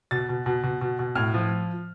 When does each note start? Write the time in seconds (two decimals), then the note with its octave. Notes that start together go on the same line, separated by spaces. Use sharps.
0.11 B2 A6
0.29 B2
0.46 B2
0.63 B2
0.81 B2
0.99 B2
1.15 A2 F6
1.34 F3